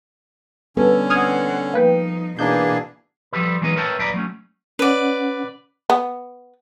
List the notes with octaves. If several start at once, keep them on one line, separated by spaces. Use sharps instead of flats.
D3 G3 B3 C#4 A4
C4 F#5 D#6 F6 G#6
F3 A#3 D#4 B4 G5
B2 E3 A#3 C4 D4 D#4 G#4 G6
F3 G3 G4 A4 B4
E3 F#3 G#3 B3 D#4 B4
A#4 B4 C#5 E5 G5 A5
D#2 F#3 B4 D5 A#5 B5
F#3 A3 C#4
C#4 B4 D5 F#5
B3